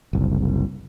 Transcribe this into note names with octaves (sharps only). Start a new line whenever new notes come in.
F#1 C2